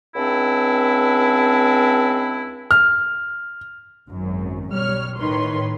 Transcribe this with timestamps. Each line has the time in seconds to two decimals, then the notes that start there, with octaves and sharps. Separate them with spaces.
0.15 C#2 C4 D4 E4
2.71 F6
4.11 G#1 F#2
4.72 B1 G3 C#5 F6
5.18 A2 D#3 B4 C#5 C6